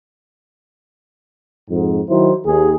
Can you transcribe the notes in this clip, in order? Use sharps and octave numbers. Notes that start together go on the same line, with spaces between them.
F2 G#2
D#3 F#3 E4 C5
D#2 G#4